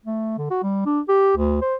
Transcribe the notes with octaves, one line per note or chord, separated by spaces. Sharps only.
A3
D3
F#4
G3
D4
G4
D2
C5